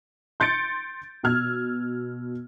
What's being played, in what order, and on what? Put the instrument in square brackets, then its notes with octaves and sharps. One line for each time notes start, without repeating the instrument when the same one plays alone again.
[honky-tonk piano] C6 G6 A6 C#7 D7
B2 E6 F6 G#6